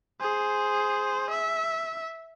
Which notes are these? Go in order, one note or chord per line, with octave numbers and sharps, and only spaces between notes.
G#4 C5
E5